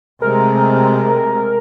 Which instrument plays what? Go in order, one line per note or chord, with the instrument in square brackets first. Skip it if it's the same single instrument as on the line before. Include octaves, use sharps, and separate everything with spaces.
[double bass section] C3 G#3 A3 [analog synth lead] A#4